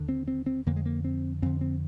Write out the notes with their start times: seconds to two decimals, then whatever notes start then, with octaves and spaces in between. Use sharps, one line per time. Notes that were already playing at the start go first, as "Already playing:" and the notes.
Already playing: D#2 D3
0.09 C4
0.28 C4
0.46 C4
0.66 F2 D3 A#3
0.76 G#3
0.86 A#3
1.05 C4
1.42 F2 D3 C4
1.61 C4